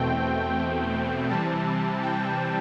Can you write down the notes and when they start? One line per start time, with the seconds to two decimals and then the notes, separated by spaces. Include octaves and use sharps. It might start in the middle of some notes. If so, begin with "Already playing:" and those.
Already playing: E2 B2 A3 C4 G5
0.55 G5
1.30 C3 E3 G3 C4 A5
2.03 G5